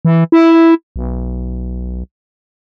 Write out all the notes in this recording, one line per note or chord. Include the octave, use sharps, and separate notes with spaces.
E3
E4
B1